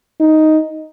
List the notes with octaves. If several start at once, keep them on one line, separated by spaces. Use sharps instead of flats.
D#4